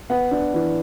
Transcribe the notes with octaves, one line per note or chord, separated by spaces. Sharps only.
B3 F#5
D4
E3